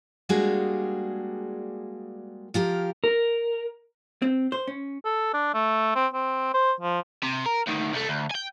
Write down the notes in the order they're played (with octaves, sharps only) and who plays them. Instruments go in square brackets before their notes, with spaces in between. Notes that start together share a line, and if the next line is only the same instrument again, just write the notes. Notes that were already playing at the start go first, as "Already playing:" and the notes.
[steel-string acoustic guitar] G3 G#3 A#3 D4 F#4 G#4
F3 F4 G4 A#4
[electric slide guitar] A#4
[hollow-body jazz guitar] C4
C5
C#4
[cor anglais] A4
D4
A3
C4
C4
C5
F3
[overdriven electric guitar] C3
A#4
D2 D#3
C2 A3
D2
G5 G#5